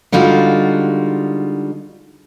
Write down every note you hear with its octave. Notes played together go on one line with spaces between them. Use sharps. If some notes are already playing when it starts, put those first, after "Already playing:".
D3 G3 G#3 D#4 F4 F#4